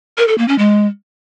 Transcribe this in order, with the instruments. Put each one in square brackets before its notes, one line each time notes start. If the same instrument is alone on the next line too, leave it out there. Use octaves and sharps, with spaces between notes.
[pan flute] A#4
A4
A#3
C#4
G#3